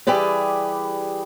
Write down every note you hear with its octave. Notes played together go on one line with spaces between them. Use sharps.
E3 G3 G4 G#4 B4 D5